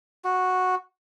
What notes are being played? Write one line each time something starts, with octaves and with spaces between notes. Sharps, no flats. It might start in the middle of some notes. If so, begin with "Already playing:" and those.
F#4